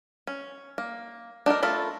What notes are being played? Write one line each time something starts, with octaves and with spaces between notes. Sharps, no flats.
C#4
A#3
D4 D#4 A4 A#4
A3 F4 A4 A#4 B5